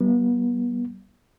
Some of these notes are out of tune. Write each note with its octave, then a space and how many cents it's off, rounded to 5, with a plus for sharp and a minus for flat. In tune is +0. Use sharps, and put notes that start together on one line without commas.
G3 -45 B3 -40